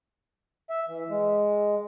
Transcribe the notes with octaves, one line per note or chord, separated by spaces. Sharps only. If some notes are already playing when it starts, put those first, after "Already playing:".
E5
E3
G#3